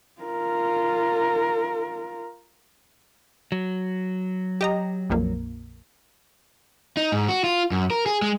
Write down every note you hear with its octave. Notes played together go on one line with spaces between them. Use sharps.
F4 A#4
F#3
G4 D#5 A#5
A#1 F2 A#3
D#4
G#2
F#4
F4
F#2
A#4
G#4
G#3